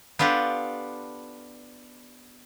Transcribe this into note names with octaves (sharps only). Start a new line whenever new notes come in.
B3 D4 F4 G4 A4